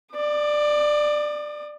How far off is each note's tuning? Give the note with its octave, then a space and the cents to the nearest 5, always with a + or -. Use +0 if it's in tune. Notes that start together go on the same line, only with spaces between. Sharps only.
D5 +15 D#6 -40